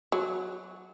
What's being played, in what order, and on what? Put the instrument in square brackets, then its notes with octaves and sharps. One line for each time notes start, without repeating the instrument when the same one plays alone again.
[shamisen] F#3